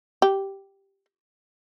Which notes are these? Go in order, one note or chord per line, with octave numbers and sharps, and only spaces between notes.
G4